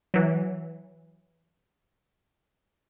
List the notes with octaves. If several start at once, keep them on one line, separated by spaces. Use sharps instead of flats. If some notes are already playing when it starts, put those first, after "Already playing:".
E3 F#3